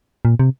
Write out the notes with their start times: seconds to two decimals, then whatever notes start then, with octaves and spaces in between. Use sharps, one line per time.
0.25 A#2
0.39 C3